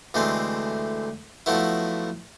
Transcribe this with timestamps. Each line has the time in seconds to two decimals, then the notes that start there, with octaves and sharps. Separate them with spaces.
0.14 D2 E3 G#3 A3 C4
1.46 F3 F#3 A3 B3 E4